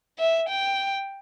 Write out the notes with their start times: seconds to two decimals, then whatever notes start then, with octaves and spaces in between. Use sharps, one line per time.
0.19 E5
0.49 G5